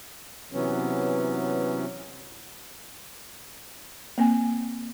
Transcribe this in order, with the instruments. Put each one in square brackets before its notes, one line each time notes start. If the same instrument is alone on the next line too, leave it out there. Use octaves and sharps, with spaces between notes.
[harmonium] C3 E3 F#3 B3 C#4
[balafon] A#3 C4 G#5